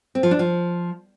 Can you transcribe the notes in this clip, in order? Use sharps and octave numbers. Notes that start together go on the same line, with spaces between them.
C4
F3
D4
F3